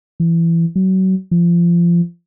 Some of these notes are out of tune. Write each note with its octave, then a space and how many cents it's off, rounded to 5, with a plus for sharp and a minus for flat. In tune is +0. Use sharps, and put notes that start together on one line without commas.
E3 +20
F#3 +30
F3 -25